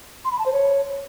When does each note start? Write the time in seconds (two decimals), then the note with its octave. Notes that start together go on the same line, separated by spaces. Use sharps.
0.25 C6
0.32 B5
0.39 A5
0.46 C5
0.53 C#5